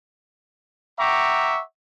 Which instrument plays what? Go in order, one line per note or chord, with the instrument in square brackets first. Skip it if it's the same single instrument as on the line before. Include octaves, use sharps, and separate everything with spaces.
[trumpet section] E5 F#5 G5 A#5 C#6 D6